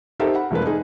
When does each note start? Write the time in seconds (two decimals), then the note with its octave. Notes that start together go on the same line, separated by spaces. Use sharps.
0.20 D#4 G4 A4 A#4 C5 E5
0.35 F#5 B5
0.51 F1 F3 G#3 A#3 B4
0.66 D#4 G#4